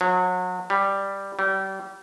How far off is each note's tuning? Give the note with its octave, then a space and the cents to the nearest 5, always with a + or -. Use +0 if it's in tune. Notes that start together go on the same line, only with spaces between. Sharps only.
F#3 -30
G3 +5
G3 -30